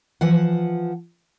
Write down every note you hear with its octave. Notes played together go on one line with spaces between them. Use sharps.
E3 F3 F#5